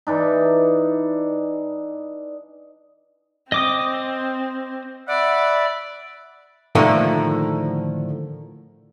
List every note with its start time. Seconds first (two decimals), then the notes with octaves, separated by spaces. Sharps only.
0.07 E3 D4 D#4
3.52 C4 D#5 D6 D#6
5.08 D5 E5 F#5 B5
6.75 A2 D3 D#3 F3 A3 A#3